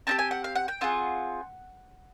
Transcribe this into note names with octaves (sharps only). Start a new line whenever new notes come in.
C4 D#4 G4 A5
G#5
F#5
F5
F#5
G5
C4 F4 G#4 F#5